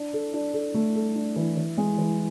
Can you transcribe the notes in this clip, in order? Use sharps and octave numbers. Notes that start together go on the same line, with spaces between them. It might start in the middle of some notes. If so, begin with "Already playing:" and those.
Already playing: D4
A4
D4
A4
A3
A4
D4
E3
E3
G#3
E3